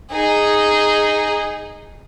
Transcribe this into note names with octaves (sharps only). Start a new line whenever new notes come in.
D#4 G#4